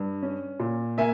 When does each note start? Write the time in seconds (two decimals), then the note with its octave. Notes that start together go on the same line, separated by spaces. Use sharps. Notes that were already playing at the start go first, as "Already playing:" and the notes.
Already playing: G2
0.23 C#4
0.60 A#2
0.98 A#3 E5 G#5